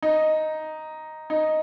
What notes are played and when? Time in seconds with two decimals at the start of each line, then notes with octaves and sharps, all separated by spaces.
0.02 D#4
1.30 D#4